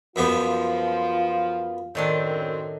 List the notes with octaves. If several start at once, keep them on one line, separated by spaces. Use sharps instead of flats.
F#2 F3 G3 B3 F4
F#2 A2 D#3 C4 D4